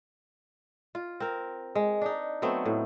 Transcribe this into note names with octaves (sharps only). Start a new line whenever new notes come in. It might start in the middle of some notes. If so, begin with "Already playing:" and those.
F4
C4 A#4
G#3
D4 D#4
F#3 A3 B3 C4
A2